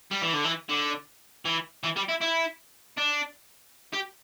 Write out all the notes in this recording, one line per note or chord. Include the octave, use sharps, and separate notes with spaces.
G3
E3
D3
E3
D3
E3
E3
G3
E4
E4
D4
G4